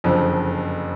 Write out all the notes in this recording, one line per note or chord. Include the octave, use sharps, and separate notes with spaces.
F#1 F2 D3 F3